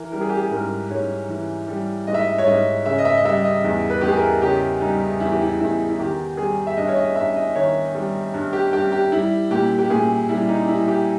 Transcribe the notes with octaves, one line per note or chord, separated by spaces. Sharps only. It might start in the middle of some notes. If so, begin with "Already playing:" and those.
Already playing: E3 A#4
G3 A#4
G#4
G4
G#4
G#2 A#4
G#2 C#5
E3
G3
G#2 D#5
E5
D#5
C#5
G#2 D#5
C#3 E5
D#5
E5
D#5
G3 E5
D#5
E2
B4
E2 G4
G#4
A#4
C#3 G4
G3 D#4
E2 E4
G4
E4
E2 E4
E4
D#3 G4
G3 G#4
E5
G2 D#5
C#5
D#5
G2 E5
D#5
D#3 C#5
G3
G2
G4
G2 G4
G4
G3 E4
A#2 G4
G4
A#2 G#4
G3 E4
D#4
G3 E4
G4